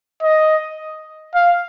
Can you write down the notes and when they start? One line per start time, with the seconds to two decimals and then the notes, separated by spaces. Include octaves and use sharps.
0.23 D#5
1.35 F5